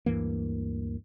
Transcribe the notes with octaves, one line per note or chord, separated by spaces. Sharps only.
D2 G2 E3 A#3